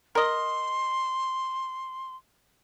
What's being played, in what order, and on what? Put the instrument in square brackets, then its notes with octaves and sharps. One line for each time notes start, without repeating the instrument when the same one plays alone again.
[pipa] A#4 D#5 [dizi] C6